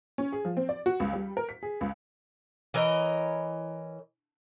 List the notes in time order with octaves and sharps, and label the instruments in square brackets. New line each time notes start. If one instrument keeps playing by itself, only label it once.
[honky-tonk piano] C#4
G#4
F3
C4
D5
F#4
C#2
G3
A#4
B6
G#4
C#2
[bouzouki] E3 A#4 C#5 D#5